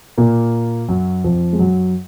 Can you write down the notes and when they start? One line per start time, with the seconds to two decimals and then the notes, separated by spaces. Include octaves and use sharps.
0.18 A#2 A#3
0.89 F#2 F#3
1.24 F2 F3
1.53 G#3
1.59 F#2 F#3